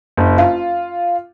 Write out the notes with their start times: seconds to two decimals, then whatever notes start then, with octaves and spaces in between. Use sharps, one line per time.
0.17 F#1
0.38 F4